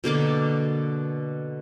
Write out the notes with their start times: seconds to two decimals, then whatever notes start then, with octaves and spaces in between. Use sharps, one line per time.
0.04 B2 D3 A#3 D6